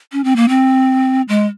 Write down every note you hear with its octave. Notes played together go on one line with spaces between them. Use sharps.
C#4
C4
A#3
C4
G#3